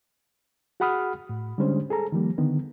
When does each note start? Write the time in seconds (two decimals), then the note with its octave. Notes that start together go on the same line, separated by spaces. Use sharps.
0.80 F#4 G#4 F#5 B5 D#6 F6
1.29 A2
1.58 D3 G3 G#3 C#4 D4 C5
1.90 G#4 A4 A#5
2.12 D#3 F3 G3 A#3
2.38 D3 D#3 B3